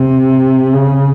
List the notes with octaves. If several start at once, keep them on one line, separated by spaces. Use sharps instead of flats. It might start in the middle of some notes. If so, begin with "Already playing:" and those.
Already playing: C3
C#3